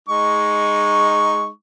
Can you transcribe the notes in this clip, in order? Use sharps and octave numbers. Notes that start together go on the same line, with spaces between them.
G#3 D#4 C#6